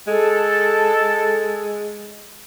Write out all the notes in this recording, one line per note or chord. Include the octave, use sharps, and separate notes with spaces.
G#3 A4